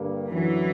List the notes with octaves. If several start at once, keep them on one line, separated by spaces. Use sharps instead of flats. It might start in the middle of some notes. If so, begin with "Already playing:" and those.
Already playing: G2 D3 G3 A#3
F#2 D3 E3 F#3